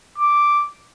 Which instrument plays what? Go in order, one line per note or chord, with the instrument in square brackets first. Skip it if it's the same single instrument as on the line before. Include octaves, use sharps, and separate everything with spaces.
[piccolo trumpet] D6